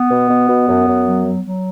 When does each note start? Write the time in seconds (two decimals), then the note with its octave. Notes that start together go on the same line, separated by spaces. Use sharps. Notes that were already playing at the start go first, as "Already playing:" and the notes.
Already playing: B3
0.10 B2
0.29 B2
0.48 B2
0.68 F#2
0.87 F#2
1.05 F#3
1.25 F#3
1.44 F#3